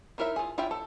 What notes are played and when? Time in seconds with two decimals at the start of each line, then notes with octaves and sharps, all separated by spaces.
0.18 D#4 E4 A#4 B4 E5
0.36 F4 G#4
0.58 E4 F4 G4 E5 G5
0.71 A4